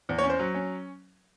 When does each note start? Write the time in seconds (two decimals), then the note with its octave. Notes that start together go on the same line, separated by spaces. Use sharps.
0.09 E2
0.18 C#5
0.24 C#4
0.30 C5
0.39 F#3
0.54 C#4